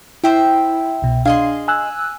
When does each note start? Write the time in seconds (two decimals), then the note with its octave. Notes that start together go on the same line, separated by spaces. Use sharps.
0.24 E4 C5 E5 G5
1.02 C2 B2
1.25 D4 G#4 D#5 F5 C6
1.68 G#5 E6 F#6